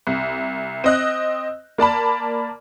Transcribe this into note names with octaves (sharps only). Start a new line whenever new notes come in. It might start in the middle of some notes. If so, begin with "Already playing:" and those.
C2
C4 D#5 F#6
A#3 D5 A5 B5